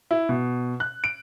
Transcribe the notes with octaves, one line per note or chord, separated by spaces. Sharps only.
E4
B2
F#6
D7